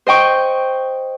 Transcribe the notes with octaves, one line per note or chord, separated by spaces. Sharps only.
C5 D#5 G5 C#6